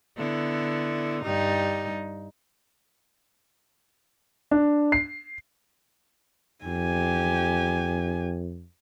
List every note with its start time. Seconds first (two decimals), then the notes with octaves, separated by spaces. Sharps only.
0.17 D3 B3 E4
1.22 G2 G3 D#4
4.51 D4
4.92 C7
6.65 F2 G4 G#5